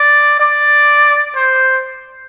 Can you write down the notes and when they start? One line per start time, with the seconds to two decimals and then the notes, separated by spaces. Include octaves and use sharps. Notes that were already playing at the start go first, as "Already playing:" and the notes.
Already playing: D5
0.40 D5
1.36 C5